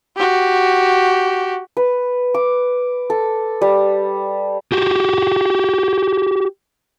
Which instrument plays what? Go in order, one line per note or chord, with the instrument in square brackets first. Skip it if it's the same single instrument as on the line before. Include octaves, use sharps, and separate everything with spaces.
[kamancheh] F#4 G4
[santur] B4
D6
A4
G3
[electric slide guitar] F#4 G4